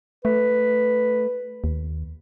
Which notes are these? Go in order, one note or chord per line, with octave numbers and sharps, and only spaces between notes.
A3 B4
D#2